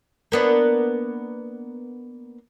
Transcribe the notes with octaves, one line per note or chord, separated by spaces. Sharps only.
A#3 B3 D4